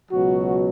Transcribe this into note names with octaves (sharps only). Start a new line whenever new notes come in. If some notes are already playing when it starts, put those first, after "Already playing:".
C#2 B2 F#3 F#4